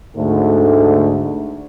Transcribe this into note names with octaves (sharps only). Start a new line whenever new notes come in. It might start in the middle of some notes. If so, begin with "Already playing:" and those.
D2 G#2 D3 A3